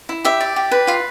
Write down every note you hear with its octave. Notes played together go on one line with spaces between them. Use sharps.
E4
G4 E5
D5
G4
B4
F4 F5